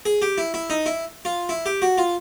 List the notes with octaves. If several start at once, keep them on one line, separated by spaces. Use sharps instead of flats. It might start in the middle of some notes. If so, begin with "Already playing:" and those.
G#4
G4
E4
E4
D#4
E4
F4
E4
G4
F#4
F4